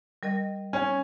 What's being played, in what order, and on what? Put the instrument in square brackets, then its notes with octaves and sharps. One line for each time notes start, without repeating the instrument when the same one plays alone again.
[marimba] G3 A#4 D#5
[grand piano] C#4